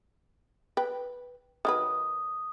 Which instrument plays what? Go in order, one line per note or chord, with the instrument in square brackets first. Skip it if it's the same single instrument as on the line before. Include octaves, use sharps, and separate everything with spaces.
[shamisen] B4 G5
[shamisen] D#3 F#3 B4 [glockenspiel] D#6